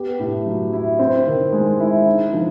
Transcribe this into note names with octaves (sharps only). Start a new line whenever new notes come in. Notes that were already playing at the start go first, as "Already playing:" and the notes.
Already playing: B3 G4
A2
F#3
E4
C4
D#3
G#3
E4
D#4
F3